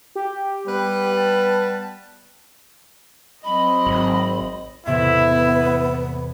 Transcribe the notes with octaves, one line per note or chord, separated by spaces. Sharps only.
G4
G3 B3 B4
A5
F#3 C4 D#5 B5
G#1
E2 A2 C3 B3 E4